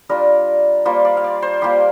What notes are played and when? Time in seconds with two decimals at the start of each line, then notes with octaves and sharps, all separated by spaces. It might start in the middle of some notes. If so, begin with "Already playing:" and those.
0.09 G3 D4 F4 A#4
0.85 G3 A#3 F4 C5
1.05 D5
1.17 F5
1.24 D5
1.42 C5
1.62 G3 A#3 F4 G4